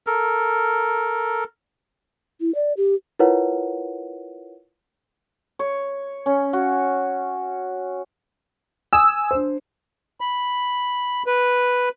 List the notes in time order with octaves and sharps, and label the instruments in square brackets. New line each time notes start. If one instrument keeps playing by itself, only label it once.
[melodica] A4 A#4
[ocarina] E4
D5
G4
[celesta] E4 F4 A#4 B4 C#5 F#5
[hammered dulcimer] C#5
C#4
F#4
[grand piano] G#5 D#6 [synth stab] E6
[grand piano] D4 C5
[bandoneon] B5
B4